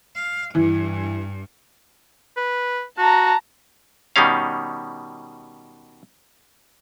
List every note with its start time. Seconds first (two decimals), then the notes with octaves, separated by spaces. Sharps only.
0.15 F5
0.55 G2 E3
2.37 B4
2.98 F#4 A5 A#5
4.16 B2 D#3 G3 C#4 F5